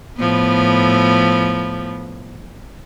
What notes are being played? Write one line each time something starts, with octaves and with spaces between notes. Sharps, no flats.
A2 F3 B3